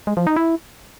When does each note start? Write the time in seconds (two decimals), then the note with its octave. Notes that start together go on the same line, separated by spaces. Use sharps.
0.07 G#3
0.17 F3
0.27 D#4
0.36 E4